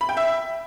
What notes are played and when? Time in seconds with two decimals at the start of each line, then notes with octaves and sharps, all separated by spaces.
0.01 B5
0.09 G5
0.17 E5